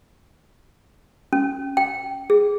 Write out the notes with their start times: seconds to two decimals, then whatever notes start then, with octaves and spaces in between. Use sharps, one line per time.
1.33 C#4
1.77 G5
2.30 G#4